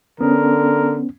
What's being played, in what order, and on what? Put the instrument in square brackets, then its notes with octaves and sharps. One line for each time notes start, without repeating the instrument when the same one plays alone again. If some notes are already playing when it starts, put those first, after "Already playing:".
[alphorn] D3 [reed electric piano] B3 C#4 [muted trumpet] A#4